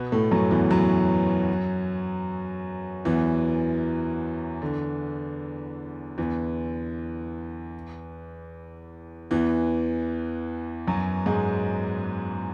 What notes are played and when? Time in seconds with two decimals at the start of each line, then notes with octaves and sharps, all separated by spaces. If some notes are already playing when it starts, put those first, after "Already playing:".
Already playing: B2 B3
0.12 A2 A3
0.31 F#2 F#3
0.51 E2 E3
0.71 F#2 F#3
3.05 E2 E3
4.62 D3
6.18 E2 E3
9.31 E2 E3
10.87 F#2 F#3
11.26 G#2 G#3